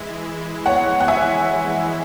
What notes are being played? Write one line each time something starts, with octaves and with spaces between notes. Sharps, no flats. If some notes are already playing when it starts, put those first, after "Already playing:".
Already playing: E3 G#3 E4
C#5 F#5
F#5
E5 G#5